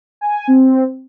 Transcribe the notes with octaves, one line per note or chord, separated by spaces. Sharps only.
G#5
C4